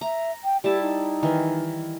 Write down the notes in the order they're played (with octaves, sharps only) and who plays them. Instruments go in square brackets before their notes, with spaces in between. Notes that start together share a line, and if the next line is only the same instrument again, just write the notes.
[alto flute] E5 [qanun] A#5
[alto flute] G5
[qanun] G3 E4 A5 [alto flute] G4
[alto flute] D#4
[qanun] D#3 E3